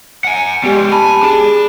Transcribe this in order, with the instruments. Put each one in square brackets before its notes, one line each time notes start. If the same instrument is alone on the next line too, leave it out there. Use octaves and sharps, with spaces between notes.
[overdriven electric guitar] F#5 G#5
[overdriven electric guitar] G3 G#3 [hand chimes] B3 G4
[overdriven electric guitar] G#5 [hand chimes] A5 B5
[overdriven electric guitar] D4 A5 [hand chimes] G#4